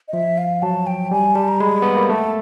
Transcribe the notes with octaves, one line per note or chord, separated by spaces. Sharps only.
D#5
F3 E5
F5
F#3 A5
G5
G3 G#5
G3 A5
A#5
G#3 B5
B3
A#3
A3 A5